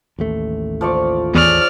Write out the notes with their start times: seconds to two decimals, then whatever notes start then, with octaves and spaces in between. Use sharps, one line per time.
0.19 A1 D#2 A3
0.81 F3 D5 C#6
1.35 E2 G#4 C#5 D5 F6